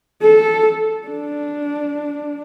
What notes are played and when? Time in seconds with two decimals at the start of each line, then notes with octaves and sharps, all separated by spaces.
0.22 A4
1.08 D4